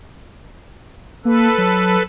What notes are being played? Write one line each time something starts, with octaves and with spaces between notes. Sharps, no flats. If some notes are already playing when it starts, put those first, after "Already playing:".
A#3 A4 B4
F#3